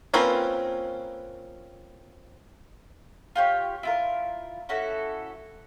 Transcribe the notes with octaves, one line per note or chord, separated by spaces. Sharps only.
A#3 C4 C#4 F4 B4
F4 G4 C#5
E4 F4 A#4
C#4 E4 F#4 A4